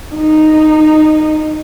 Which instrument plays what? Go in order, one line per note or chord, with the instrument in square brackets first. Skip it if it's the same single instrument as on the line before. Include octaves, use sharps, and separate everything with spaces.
[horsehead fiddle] D#4